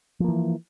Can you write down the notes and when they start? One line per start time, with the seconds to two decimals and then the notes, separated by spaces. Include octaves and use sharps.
0.20 F3
0.24 A#3
0.28 E3